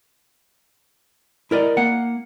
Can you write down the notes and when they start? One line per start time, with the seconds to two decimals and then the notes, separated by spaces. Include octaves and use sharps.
1.51 E4 A#4 D5 D#5
1.77 A#3 F#5